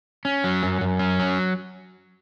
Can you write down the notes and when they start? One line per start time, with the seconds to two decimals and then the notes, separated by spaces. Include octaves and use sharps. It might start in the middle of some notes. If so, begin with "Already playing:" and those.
0.25 C#4
0.44 F#3
0.63 F#2
0.81 F#2
0.99 C#4
1.19 F#3